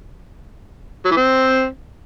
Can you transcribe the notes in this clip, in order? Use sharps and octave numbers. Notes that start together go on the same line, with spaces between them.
F#3
E3
C4